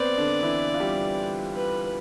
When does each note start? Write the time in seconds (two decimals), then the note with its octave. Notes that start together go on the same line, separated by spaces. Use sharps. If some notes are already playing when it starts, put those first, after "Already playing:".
Already playing: B3 C4 B4 C5 D5
0.18 D3 D4
0.42 E3 E4
0.74 F4
0.80 G3 G4
1.55 B4